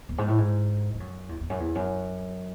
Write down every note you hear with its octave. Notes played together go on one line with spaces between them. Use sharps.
E2
G#2
A2
G#2
G#2
F#2
E2
E2
F#2
E2
F#2